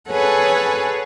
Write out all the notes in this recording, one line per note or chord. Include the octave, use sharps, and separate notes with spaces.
G#4 A4 B4 C#5 F#5